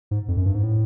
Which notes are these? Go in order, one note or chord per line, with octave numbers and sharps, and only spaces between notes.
G#2
F2
F#2
G2
G#2
A2